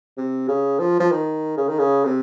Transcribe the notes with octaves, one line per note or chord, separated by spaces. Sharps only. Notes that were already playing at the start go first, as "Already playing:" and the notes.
C3
C#3
F3
F3
D#3
C#3
D#3
C#3
C3